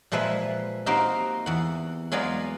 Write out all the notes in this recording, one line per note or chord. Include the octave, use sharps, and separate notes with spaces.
A#2 F3 G#3 B4 E5
A#3 C4 D#4 F#4 G4 A#4
E2 F#5
F#3 G#3 B3 F4 D5